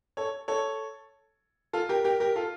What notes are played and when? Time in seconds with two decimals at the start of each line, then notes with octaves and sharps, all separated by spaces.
0.17 A4 C#5
0.48 A4 C#5
1.73 F4 A4
1.89 G4 A#4
2.04 G4 A#4
2.20 G4 A#4
2.36 F4 A4